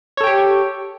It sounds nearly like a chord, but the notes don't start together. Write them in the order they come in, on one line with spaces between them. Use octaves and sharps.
C#5 A4 G5 G4